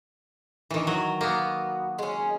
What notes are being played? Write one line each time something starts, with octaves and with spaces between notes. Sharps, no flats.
D#3 E3
F#3
A#3 B3 F#4
G#3 C#4